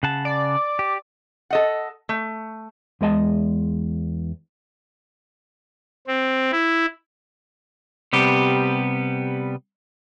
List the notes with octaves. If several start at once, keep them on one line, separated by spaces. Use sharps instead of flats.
C#3 F#5 A5
D5
G4
A4 D#5 F#5
A3
E2 G#3 D#5 A5
C4
E4
C3 G3 B3 G4